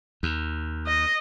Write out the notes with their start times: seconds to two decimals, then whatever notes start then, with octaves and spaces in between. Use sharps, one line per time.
0.23 D#2
0.87 D#5